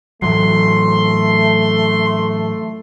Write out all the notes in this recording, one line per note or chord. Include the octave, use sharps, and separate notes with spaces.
A2 E3 F#3 A3 C6